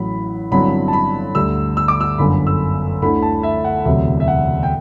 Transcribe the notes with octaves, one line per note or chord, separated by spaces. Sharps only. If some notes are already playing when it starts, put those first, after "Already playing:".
Already playing: A1 A2 F#3 B5
G1 G2 F#3 C4 E4 B5
A5
B5
D2 D3 G3 E6
E6
D6
E6
G1 F#2 D3 B5
E6
D2 D3 A3 E4 B5
A5
E5
F#5
E1 D2 C3 F#3 E5
E5
F#5
G5